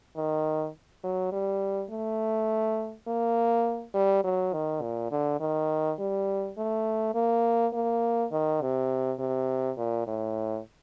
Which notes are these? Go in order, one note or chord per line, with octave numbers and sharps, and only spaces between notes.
D#3
F#3
G3
A3
A#3
G3
F#3
D#3
A#2
D3
D#3
G3
A3
A#3
A#3
D#3
C3
C3
A#2
A2